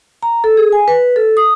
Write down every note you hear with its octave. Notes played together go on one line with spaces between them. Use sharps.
A#5
A4
G#4
G#5
B4
A4
D#6